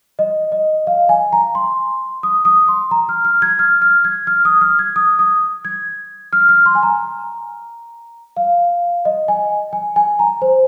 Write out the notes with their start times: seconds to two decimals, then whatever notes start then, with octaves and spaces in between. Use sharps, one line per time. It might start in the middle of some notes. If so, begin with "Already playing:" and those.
0.19 D#5
0.52 D#5
0.87 F5
1.09 G#5
1.33 A#5
1.55 C6
2.23 D#6
2.45 D#6
2.68 C6
2.91 A#5
3.09 F6
3.25 F6
3.42 G#6
3.59 F6
3.82 F6
4.05 G#6
4.27 F6
4.45 D#6
4.61 F6
4.79 G#6
4.96 D#6
5.19 D#6
5.65 G#6
6.33 F6
6.49 F6
6.66 C6
6.75 G#5
6.83 A#5
8.37 F5
9.05 D#5
9.28 G#5
9.73 G#5
9.96 G#5
10.19 A#5
10.42 C5